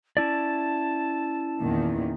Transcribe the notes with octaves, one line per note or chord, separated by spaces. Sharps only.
C#4 E4 D5 A5
E2 A#2 D#3